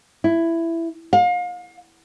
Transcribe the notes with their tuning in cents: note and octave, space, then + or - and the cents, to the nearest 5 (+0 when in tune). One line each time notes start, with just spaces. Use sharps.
E4 +10
F5 +35